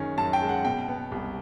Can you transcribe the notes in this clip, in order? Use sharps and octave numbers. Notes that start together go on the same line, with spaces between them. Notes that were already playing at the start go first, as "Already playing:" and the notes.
Already playing: F#2 D#3 G#3 C#4
F#2 A5
G5
G#3
F#5
B2 G5
B3
C2